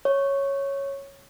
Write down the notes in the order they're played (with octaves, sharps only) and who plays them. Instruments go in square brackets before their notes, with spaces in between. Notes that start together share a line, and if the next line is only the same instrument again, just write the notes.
[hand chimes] C#5